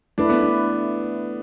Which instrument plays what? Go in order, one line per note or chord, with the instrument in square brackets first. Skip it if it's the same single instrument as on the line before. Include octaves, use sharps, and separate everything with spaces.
[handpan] A3 E4 B4 [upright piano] D4
[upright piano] B3
D4